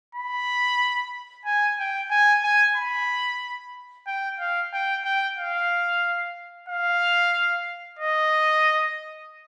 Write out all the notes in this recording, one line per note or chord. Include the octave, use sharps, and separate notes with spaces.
B5
G#5
G5
G#5
G#5
B5
G5
F5
G5
G5
F5
F5
D#5